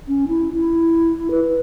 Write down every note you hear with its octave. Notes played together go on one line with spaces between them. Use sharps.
C#4
E4
E4
B4